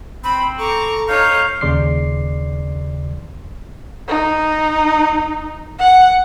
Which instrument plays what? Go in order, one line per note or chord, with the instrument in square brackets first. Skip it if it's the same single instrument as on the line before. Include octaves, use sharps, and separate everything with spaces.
[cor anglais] C4 [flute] B5
[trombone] A4 [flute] A#5 [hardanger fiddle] C#6 D6
[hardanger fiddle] D#4 C#5 [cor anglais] F5 [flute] G6
[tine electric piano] D#2 C#3 D5 C6 D6 C7
[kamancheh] D#4
F#5